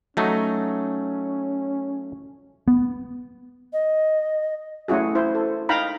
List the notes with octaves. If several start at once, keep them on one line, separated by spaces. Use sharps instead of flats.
F#3 A3 C#4 D#4
B3
D#5
A3 C#4 E4 F#4 G#4
E4 C5
A4
D#4 F5 G5 A#5 B5